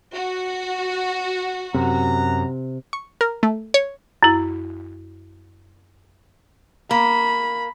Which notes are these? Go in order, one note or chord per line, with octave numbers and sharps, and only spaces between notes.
F#4
F#2 C3 F#5 A#5
C#6
A#4
A3
C#5
F#2 E4
A#3 B5